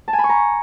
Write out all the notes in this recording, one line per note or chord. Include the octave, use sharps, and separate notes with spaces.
A5
G#5
B5
C#6
A#5